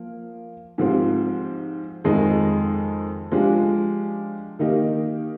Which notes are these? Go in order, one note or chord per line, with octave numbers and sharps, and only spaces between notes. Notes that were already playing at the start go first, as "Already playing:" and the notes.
Already playing: F3 A#3
G#2 F3 C4 G4
F2 D#3 G#3 D#4
F3 G#3 D4 G4
D#3 A#3 D#4 G4